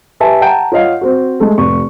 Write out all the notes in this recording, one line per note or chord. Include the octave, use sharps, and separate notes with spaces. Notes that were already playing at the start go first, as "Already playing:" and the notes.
G4 B4 E5 G#5 A5
F#5 G5 A5 A#5 G6 D7
F4 C#5 D#5 F5 F#5
C4 F#4
G#3 A3 A4
F1 C#6